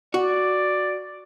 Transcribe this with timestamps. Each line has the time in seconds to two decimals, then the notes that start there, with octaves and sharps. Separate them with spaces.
0.14 F#4 D5